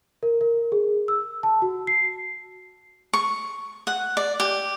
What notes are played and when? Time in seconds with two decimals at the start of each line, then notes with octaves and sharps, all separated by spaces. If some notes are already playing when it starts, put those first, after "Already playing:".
0.23 A#4
0.41 A#4
0.72 G#4
1.08 E6
1.43 A5
1.62 F#4
1.87 C7
3.13 C#6
3.87 F#5
4.17 D5
4.40 G4